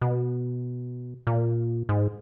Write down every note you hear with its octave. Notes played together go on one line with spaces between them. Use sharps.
B2
A#2
G#2